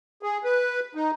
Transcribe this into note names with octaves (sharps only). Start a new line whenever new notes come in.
G#4
B4
D#4